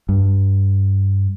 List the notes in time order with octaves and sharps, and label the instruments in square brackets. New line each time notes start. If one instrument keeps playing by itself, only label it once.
[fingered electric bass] G2